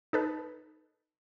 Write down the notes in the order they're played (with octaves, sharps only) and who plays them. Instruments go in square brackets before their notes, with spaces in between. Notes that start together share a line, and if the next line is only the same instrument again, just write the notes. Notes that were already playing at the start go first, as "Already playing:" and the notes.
[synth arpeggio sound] D#4 A4 B4